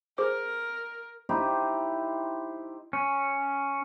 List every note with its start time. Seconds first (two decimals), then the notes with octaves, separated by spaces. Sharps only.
0.18 G#4 A#4 C5 D6
1.29 D#4 E4 G4 C5
2.93 C#4